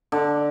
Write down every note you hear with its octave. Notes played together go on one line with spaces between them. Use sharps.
D3